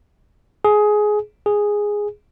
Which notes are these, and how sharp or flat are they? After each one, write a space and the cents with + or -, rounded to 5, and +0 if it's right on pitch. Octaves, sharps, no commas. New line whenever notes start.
G#4 +15
G#4 -5